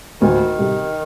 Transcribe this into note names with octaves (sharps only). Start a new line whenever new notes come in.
D2 D#3
C3 G3